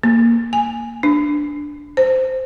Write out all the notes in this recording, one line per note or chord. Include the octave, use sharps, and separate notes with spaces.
A#3
G#5
D4
C5